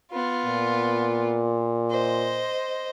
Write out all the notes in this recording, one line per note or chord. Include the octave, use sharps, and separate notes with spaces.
B3 F4
A#2
C5 D#5